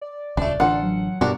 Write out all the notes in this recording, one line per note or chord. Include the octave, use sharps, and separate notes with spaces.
D5
D#1 C#2 A3 D4
A1 D3 F4 A4 F#5
F#3
G2 B2 D4 F#4 G4 A#4